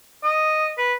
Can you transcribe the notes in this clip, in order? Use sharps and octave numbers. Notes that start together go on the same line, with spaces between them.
D#5
B4